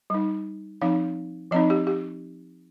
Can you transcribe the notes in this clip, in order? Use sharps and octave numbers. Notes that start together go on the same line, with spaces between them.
G3 D#4
F3 C4 D#4 F5
F3 C4 D#4 D#5
G4
G4